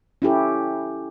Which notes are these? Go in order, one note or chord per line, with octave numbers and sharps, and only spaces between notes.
C#4 E4 G4 A4